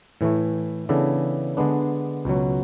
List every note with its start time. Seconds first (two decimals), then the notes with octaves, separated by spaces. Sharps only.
0.21 A2 E3 A3
0.89 C#3 E3 B3 D4 A4
1.57 D3 G#3 B3 D4
2.25 C#2 B2 F#3